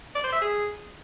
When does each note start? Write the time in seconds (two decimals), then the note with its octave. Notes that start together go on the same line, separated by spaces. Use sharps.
0.15 D5
0.24 C5
0.33 E5
0.41 G#4